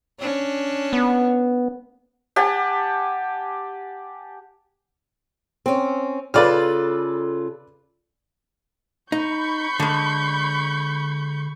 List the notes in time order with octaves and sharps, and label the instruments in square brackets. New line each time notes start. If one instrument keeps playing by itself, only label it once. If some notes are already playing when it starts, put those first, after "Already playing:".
[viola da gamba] C#4 D4
[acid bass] B3
[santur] G4 F#5 G#5 A5
[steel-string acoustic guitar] C4 C#4
[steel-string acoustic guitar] C#3 F4 A4 [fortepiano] B4 D5 F6
[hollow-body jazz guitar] D#4 [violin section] B5 C#6 G6
[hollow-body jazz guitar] D3 G#3